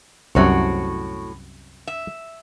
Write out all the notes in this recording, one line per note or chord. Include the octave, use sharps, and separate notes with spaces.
C2 F#2 A2 C3 F#4 C#5
E5